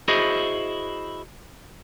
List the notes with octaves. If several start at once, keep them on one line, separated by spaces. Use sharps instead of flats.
E4 F#4 G#4 C5 D#5